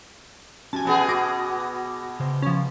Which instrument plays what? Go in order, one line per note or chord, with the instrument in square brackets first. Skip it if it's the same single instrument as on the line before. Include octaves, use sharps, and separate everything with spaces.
[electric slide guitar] C#4 F#4 G4 [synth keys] G#5 A5
[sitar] B2 B3 G#4
[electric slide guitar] F#4 [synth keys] D6 D#6 A#6
[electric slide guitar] C#3 C5
[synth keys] F3 C#4